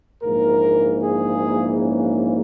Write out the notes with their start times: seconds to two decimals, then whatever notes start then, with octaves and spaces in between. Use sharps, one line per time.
0.22 A#1 G#2 E3 A#3 A#4
1.01 G#4
1.79 C#4